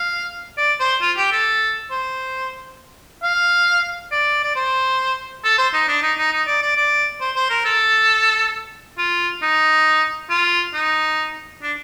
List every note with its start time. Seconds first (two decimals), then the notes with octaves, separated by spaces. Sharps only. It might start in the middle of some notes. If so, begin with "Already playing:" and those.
Already playing: F5
0.58 D5
0.80 C5
1.01 F4
1.17 G4
1.32 A4
1.91 C5
3.23 F5
4.12 D5
4.44 D5
4.56 C5
5.44 A4
5.58 C5
5.74 D#4
5.88 D4
6.02 D#4
6.18 D#4
6.32 D#4
6.47 D5
6.62 D5
6.76 D5
7.21 C5
7.36 C5
7.50 A#4
7.65 A4
8.98 F4
9.42 D#4
10.30 F4
10.74 D#4
11.62 D4